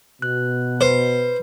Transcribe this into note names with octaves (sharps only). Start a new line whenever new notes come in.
B2 F#6
B4 C5